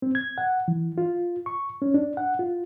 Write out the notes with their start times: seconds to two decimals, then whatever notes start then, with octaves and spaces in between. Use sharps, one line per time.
0.02 C4
0.15 G#6
0.38 F#5
0.68 E3
0.98 F4
1.46 C#6
1.82 C#4
1.94 D4
2.17 F#5
2.39 F4